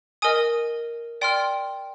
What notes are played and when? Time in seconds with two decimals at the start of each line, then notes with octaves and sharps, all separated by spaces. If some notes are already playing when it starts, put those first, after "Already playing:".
0.22 A#4 D#5 G#5 D#6
1.21 D5 G5 C6 F6